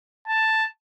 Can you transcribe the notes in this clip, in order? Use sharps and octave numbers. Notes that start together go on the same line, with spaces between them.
A5